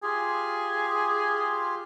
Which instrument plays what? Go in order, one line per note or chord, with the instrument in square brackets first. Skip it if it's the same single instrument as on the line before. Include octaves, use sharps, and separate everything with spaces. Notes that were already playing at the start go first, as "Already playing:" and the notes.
[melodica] F4 G4 [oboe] G#4